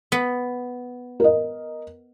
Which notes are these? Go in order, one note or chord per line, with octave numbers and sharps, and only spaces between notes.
B3
A#4 D#5